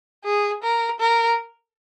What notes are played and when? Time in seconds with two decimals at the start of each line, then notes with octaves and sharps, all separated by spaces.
0.24 G#4
0.63 A#4
1.00 A#4